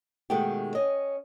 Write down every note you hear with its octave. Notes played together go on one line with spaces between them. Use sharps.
B2 D#3 G#3 A3 F#4 G4
C#4 D#5